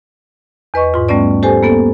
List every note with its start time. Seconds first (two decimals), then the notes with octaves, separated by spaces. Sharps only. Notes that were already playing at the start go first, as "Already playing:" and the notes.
0.74 E2 B4 D#5 C#6
0.94 G#2 F4
1.09 G3 A3 B3 C#4 D5
1.43 G4 A4 C5 G#5
1.63 A#3 B3 A4